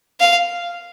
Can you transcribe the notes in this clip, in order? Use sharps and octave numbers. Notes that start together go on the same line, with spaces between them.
F5